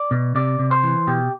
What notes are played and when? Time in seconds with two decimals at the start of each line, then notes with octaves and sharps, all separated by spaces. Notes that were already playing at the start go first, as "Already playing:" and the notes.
Already playing: D5
0.11 B2
0.35 C3 D5
0.59 C3
0.71 C5
0.84 E3
1.07 B2 G4